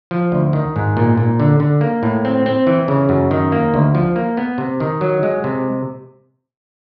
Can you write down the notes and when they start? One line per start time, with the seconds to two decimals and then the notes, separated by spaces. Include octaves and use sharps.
0.11 F3
0.32 D2
0.53 D#3
0.76 G#2
0.97 A#2
1.18 A#2
1.40 D3
1.60 D3
1.81 A#3
2.03 A2
2.25 C4
2.46 C4
2.67 E3
2.88 C#3
3.09 F#2
3.31 D#3
3.52 A#3
3.74 D2
3.95 F3
4.16 A#3
4.37 B3
4.58 C3
4.80 D#3
5.01 F#3
5.23 G#3
5.44 C3